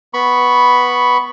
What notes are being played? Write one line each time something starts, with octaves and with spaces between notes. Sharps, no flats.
B3 B5 C#6